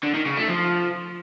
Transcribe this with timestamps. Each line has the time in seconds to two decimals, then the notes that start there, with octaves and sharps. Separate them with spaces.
0.03 D3
0.15 D#3
0.26 C#3
0.37 A3
0.48 F3